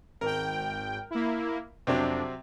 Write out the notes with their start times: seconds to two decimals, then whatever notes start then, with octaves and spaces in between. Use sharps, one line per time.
0.21 G#1 A#4 G5
1.10 A#3 E4
1.87 F2 C3 F#3 C4 D4